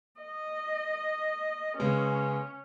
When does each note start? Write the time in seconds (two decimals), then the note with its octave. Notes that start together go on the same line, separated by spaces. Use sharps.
0.21 D#5
1.78 C#3 G#3 B3 C#4